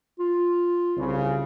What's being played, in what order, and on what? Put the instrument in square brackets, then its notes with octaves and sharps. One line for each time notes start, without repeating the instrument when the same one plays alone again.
[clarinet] F4
[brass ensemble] C2 C#3